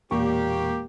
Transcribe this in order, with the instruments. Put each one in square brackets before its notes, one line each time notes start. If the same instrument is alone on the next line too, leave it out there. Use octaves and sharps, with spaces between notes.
[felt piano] E1 A#2 C#6 [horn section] A#3 G4